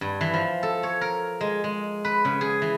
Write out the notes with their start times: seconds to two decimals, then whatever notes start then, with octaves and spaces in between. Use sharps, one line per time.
0.01 G2
0.21 E3
0.34 F3
0.63 A4
0.83 C#5
1.01 A#4
1.41 G#3
1.64 G#3
2.05 B4
2.25 C#3
2.41 G#4
2.62 E3